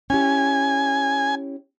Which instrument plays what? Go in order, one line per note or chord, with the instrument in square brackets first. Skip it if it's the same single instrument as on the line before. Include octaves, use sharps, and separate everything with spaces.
[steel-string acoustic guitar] C#4 E4 G4 [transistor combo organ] G#5